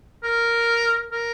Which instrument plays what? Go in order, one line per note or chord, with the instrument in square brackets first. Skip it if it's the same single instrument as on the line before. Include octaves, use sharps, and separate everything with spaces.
[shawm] A#4
A#4